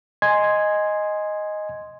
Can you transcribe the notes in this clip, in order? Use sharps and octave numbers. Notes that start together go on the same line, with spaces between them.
D#5 G#5 C6 G#6